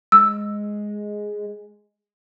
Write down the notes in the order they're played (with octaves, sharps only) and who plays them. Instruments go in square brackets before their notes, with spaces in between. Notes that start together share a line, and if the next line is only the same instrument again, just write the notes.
[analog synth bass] G#3 [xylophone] E6